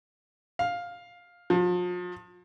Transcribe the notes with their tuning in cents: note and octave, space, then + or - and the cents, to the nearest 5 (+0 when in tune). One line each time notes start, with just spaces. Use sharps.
F5 +10
F3 +40